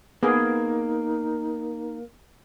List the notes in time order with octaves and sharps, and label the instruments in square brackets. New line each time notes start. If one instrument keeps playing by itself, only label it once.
[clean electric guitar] A#3 [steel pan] B3 G#4 [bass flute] D#4